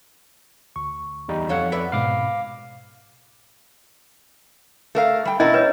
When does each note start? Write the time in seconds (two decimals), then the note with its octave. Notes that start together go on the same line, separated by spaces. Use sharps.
0.76 D2 C#6
1.28 E2 G3 D#4
1.49 F2 F4 A4 C#5 F#5
1.72 B4 D5 E5
1.92 G#2 B2 F5 B5 D6
4.95 A3 A#4 F5
5.25 G3 G5
5.40 B2 C#4 D4 E4 A#4 D#5
5.54 B4 C#5 D#5